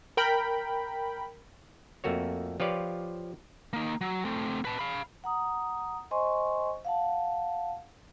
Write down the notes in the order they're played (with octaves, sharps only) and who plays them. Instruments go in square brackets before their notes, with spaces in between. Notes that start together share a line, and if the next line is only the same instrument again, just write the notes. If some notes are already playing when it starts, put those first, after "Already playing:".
[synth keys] A#4 G5 B5
[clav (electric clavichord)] F2 A3 A#3 F#4 C#5
F3 F4 G4 B4 C#5 D5
[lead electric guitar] A#3 D#4
F#3
A3 C4
B4 A5
F5 B5
[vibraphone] F#5 A#5 D#6
C5 D#5 G#5 C6 C#6
F5 F#5 A5